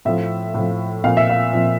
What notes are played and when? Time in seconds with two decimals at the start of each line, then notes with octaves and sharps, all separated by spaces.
0.05 A2 F3 E5
0.54 A2 F3
1.04 A#2 F3 F5
1.17 E5
1.29 F5
1.53 A#2 F3